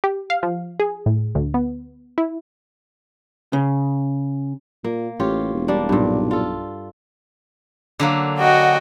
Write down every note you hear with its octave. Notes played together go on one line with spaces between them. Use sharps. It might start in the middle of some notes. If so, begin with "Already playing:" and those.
G4
F5
F3
G#4
A2
D2
B3
E4
C#3
A#2 A#3
A1 F4 G4 C#5
E1
G3 A#3 D4
B1 G2 A#2
F4 A4
D3 F#3 A#3
F#4 D#5 F#5 G5